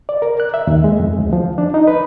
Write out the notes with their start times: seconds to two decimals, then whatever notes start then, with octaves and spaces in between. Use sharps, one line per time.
0.09 D5
0.22 A#4
0.40 F#6
0.54 E5
0.67 D#2
0.84 G#3
1.00 F2
1.19 D2
1.33 F3
1.58 D4
1.74 D#4
1.87 B4